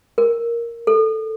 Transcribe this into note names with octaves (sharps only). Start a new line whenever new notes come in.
A#4
A4